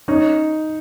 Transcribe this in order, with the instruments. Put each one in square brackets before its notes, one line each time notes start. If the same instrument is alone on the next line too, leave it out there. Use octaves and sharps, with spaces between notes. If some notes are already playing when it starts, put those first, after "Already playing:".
[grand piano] C#4 [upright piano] D#4